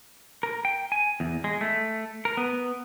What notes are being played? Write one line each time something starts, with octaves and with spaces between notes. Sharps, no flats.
A#4
G5
G#5
E2
G#3
A3
A#4
B3